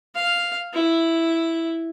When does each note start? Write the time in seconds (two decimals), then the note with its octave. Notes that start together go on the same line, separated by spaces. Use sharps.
0.15 F5
0.73 E4